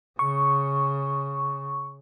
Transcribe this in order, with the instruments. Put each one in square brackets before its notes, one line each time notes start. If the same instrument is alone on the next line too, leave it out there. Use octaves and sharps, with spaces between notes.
[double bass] C#3 [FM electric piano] C#6